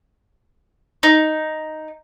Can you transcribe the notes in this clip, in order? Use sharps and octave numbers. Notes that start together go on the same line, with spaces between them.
D#4